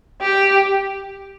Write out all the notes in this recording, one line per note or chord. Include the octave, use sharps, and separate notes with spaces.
G4